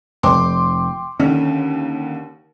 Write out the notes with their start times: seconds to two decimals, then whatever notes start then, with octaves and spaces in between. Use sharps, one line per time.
0.23 F1 G5 C6 D6
1.20 D#2 D3 C#4